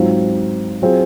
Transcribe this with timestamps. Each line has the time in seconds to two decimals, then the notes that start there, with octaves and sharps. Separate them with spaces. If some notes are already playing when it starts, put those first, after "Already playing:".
Already playing: G#2 F#3 C4 F4
0.82 F#3 C4 F4 G#4